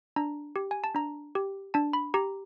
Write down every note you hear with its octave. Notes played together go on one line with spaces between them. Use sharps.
D4 A#5
G4
G#5
A5
D4 A#5
G4
D4 A5
B5
G4 A#5